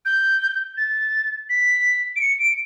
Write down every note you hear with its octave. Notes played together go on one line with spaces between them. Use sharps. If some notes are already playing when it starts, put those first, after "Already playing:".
G6
A6
B6
D7
C#7
D7